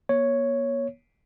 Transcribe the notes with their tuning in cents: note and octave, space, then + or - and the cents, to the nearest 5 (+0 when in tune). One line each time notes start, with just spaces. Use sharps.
A#3 +45 C#5 +0